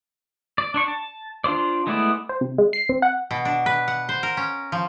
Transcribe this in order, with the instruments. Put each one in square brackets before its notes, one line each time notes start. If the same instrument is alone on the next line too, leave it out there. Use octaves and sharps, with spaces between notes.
[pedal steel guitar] D5
D4 D5 C#6
A5
D4 F4 C5 D5
G#3 A3 B3 E4 D5
[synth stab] C5
C3
G#3
C7
C4
F#5
[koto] B2
D4
B4
F#5
C5
A#4
C#4
F3